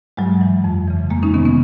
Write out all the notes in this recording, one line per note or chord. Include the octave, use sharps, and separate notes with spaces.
G2 F#3 G#3
E3
F2
C#3 E3
F2 G#3 A#3
C#4 D#4
C3 D#3 B3 C#4
B3 C#4